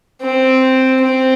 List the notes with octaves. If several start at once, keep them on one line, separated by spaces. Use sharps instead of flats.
C4
C4